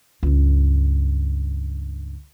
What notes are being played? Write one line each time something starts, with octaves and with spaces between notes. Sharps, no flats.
C#2 G2